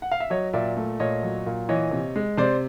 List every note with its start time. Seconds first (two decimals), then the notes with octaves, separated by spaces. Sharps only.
0.02 F#5
0.12 F5
0.20 E5
0.30 F#3 C#5 D#5
0.53 A#2 D5 E5
0.77 A3
1.00 A#2 C#5 D#5
1.23 F#3
1.46 A#2
1.69 E3 C#5 D#5
1.91 C3
2.16 G#3
2.38 C3 C5 D5